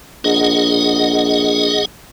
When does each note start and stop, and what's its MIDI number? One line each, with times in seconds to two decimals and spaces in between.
0.24 1.83 34
0.24 1.85 68
0.24 1.85 75
0.24 1.85 78